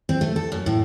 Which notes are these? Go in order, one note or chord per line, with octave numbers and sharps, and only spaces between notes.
C4
A3
A4
F#2
A2